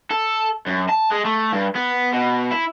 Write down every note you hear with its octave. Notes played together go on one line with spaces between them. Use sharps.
A4
F#2
A5
G#3
A3
G2
B3
B2
E4